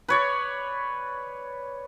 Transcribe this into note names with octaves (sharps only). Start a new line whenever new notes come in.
B4 C#5 D5